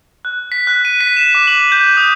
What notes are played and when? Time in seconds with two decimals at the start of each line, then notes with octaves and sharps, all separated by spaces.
0.25 F#6
0.52 B6
0.67 F#6
0.85 D#7
1.01 B6
1.17 E7
1.35 D6
1.47 F#7
1.72 G6
1.97 D#6